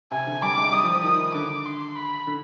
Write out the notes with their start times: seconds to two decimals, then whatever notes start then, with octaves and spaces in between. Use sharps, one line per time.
0.11 C3 G#5
0.27 D3
0.42 G3 D6
0.58 G#3
0.72 G3 D#6
0.83 F3
0.94 F3
1.04 D#3 D#6
1.35 D3 D6
1.66 C6
1.96 B5
2.27 D3